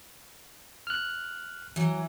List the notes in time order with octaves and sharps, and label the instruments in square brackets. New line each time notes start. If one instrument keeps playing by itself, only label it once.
[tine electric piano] F6 F#6
[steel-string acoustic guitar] E3 F#3